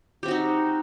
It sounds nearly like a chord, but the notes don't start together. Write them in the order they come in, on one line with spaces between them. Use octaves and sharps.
G4 C4 F#4 D#4